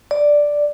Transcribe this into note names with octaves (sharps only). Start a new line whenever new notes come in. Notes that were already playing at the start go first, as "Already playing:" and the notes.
D5